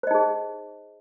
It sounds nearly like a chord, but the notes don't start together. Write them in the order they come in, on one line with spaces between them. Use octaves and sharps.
C5 D#5 D#4 G#4